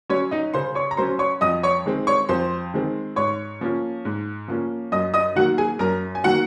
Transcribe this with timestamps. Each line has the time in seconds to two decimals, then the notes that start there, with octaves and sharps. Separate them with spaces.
0.10 F#3 C#4 C#5
0.31 D#4 D#5
0.54 C#3 C5 C6
0.75 C#5 C#6
0.91 A#5
0.97 F#3 C#4 C5 C6
1.19 C#5 C#6
1.41 F2 D#5 D#6
1.63 C#5 C#6
1.86 D#3 G#3 C4
2.07 C#5 C#6
2.29 F2 C5 C6
2.74 D#3 G#3 C4
3.16 G#2 C#5 C#6
3.61 F3 A#3 C#4
4.05 G#2
4.48 F3 A#3 C#4
4.92 F#2 D#5 D#6
5.14 D#5 D#6
5.35 D#3 F#3 A#3 F#4 F#5
5.58 G#4 G#5
5.79 F#2 A#4 A#5
6.15 G#5
6.24 D#3 F#3 A#3 F#4 F#5